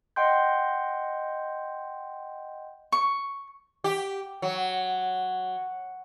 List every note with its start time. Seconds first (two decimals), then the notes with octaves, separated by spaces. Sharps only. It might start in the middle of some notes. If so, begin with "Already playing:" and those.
0.16 D#5 F#5 G5 C6 G6
2.92 C#6
3.84 G4
4.42 F#3